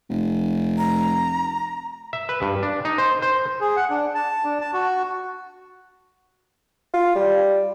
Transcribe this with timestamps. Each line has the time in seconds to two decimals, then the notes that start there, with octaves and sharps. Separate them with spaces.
0.10 F1
0.78 A#5
2.13 E5
2.29 B4
2.42 G2
2.63 D4
2.85 D#4
2.98 C5
3.22 C5
3.61 G#4
3.76 F#5
3.90 D4
4.15 A5
4.44 D4
4.61 A5
4.73 F#4
6.94 F4
7.15 G3